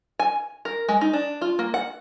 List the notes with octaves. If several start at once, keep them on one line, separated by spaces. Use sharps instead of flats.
G#5
A#4
G#3
D#4
D4
F4
A#3
F#5